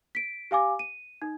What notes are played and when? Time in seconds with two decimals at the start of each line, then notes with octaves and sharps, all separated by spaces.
0.15 B6 D7
0.51 G4 F5 G#5 D6
0.79 D#7
1.22 D#4